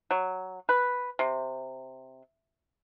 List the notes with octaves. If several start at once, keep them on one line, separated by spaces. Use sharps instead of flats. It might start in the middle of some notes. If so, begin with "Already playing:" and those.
F#3
B4
C3